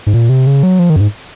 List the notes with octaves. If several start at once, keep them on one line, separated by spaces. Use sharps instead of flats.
G#2
A#2
C3
C#3
F#3
F3
D#3
F#2
G#2